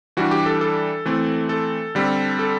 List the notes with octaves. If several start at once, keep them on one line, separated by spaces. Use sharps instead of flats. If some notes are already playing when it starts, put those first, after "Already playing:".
E3 G3 D4 F#4
G4
A4
A4
E3 A3 C4
A4
D3 G3 C4
A4